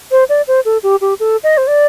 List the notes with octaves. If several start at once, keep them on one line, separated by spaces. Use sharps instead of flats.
C5
D5
C5
A4
G4
G4
A4
D#5
C5
D5